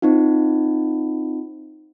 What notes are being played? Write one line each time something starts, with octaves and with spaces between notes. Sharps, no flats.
C4 D#4 F4